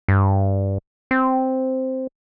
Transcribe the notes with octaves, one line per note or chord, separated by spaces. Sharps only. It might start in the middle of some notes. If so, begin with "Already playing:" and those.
G2
C4